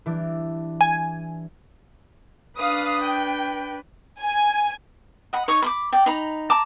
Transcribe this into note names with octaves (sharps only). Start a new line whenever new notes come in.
E3 G3 D4
G#5
D4 B4 F5 D#6
G5
G#5
D#5 F#5 B5
D#4 C#5 C#6 D#6
B5 C6 D6
D5 G5
D#4 A#5 B5
A5 A#5 D6